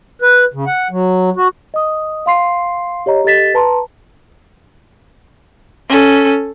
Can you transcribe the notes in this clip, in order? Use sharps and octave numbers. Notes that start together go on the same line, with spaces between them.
B4
C#3
F#5
F#3
F#4
D#5 D#6
F5 C6 C7
G4 C#5 D#5 A#5
G4 A4 D#5 A6 B6 E7
B4 A5 A#5 C6
C#4 A4